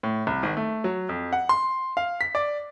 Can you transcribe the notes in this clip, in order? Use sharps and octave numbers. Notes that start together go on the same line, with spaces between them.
A2
C2
G#1
A3
F#3
F2
F#5
C6
F5
B6
D5